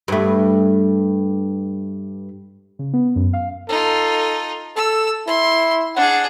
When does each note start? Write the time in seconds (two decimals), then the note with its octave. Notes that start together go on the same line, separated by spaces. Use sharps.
0.08 G2 A3
2.79 C#3
2.93 B3
3.16 F#2
3.33 F5
3.69 D#4 F4 A4
4.76 A4 E6
5.27 E4 C6
5.96 D4 G#4 F#5